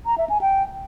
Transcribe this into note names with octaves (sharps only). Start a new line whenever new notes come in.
A#5
E5
G#5
G5